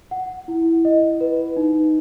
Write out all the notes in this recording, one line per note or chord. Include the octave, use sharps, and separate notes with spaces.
F#5
E4
D#5
B4
D#4